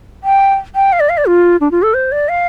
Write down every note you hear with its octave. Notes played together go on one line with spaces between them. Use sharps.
G5
G5
F5
D5
F5
D5
F4
D4
F4
A4
C5
D5
F5